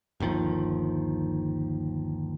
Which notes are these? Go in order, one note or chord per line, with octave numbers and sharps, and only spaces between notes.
G1 D#2 D#3 F3